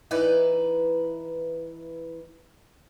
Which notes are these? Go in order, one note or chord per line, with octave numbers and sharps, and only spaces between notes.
E3 D#4 E4 B4 D5